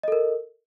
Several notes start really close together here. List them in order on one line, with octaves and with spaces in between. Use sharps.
D#5 A4 A#4